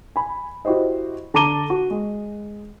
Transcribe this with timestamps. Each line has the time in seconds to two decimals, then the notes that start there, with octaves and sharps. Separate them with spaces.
0.16 G#5 B5
0.65 E4 F#4 G4 C5 D#5
1.34 D3 A5 A#5 D6 D#7 G7
1.70 F#4
1.90 G#3